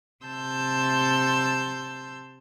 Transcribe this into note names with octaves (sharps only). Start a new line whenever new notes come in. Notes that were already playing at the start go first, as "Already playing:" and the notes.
C3 A5 C6 E6 G6